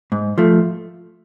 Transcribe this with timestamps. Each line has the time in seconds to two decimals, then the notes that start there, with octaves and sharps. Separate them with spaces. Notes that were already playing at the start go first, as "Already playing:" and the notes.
0.12 G#2
0.38 F3 A3